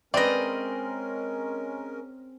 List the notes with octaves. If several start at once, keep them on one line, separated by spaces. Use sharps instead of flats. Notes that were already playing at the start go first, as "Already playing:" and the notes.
G#3 C4 C#4 A#4 B4 D5 D#5